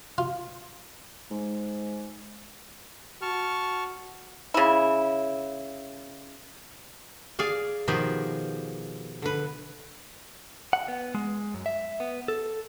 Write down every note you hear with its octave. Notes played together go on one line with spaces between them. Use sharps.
F4
G#2
F#4 A5 C#6 F6
C#3 E4
G#4 D5 F5 G#5
B2 D#3 F3 G4 G#4
D3 B4
F#5
B3
G#3
F#2
E5
B3
A4